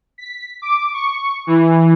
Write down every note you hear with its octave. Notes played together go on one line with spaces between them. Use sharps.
B6
D6
C#6
E3